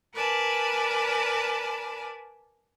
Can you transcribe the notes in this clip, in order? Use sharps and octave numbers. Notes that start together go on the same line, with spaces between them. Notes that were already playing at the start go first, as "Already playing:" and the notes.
A#4 B4 D5 G#5 A5